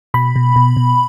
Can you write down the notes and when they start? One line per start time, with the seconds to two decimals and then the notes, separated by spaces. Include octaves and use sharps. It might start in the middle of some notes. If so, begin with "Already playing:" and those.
0.14 B2 B5
0.36 B2
0.56 B2
0.77 B2